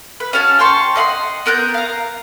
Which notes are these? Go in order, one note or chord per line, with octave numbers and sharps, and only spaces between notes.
B4
C#4 F#4 F5 A5
G5 A5 C6 C#6
D#5 E5 F#5 C6
B3 A#4 F#6 G6
F5 A#5